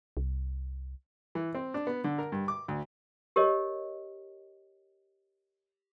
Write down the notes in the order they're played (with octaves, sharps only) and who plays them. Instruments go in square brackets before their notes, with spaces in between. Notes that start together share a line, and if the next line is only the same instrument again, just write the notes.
[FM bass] C2
[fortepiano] E3
C4
D4
B3
D3
A#4
G2
D6
D2
[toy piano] G4 A#4 C#5 D#5